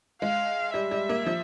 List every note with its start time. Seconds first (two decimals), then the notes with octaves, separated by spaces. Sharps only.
0.22 G#3 F5
0.74 G3 E5
0.91 G3
1.09 A#3
1.26 F3